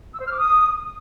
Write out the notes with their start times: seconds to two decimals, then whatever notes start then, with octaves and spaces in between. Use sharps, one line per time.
0.13 E6
0.19 C5
0.25 F6
0.32 D6
0.38 D#6